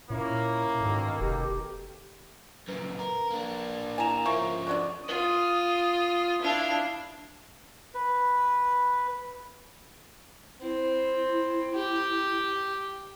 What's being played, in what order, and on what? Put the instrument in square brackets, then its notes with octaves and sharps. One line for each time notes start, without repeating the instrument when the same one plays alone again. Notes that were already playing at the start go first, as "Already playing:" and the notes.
[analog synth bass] A#2 [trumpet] A#3 [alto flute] C#4 [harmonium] E4 C#5
[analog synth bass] G#2 [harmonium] B2 D#3 A4
[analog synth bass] F1 [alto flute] G4
[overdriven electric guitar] F#2 A#2 [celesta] B4
[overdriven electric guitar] A#4
A#3 D4
[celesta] E4 E7 [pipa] G#5 A#5
[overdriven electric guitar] F3 C#4 [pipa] A#3 [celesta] E5 C#6
[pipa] D3 F#3 D4 [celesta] D5 C#6
[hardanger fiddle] F4 [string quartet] D#6
[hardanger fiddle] D4 F5 [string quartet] E4
[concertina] B4
[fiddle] C4 [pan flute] E4
[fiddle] G4